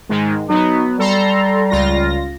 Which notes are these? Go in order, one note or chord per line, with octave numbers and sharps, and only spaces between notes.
G#2 D#3 G#3
F#3 B3 D#4
G3 A4 A#5 C6
C#2 F4 A#6